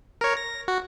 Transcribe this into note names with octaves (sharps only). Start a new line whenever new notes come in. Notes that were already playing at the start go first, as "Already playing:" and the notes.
A#4 C#5
A#6
F#4